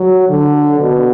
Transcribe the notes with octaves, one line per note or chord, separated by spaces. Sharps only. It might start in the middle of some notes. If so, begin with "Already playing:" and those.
Already playing: F#3
D3
B2